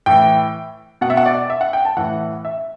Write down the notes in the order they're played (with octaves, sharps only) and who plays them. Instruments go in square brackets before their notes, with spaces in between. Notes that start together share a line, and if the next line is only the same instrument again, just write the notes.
[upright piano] A2 E3 G5
B2 F#5
E5
F#5
D5
E5
F#5
G5
A5
A2 E3 F#5
E5